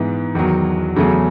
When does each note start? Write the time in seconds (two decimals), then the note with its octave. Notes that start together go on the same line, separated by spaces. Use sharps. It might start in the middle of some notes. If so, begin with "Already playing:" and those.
Already playing: G#2 E3 B3
0.35 E2 D#3 F#3
0.96 E2 C#3 F#3 A3 C#4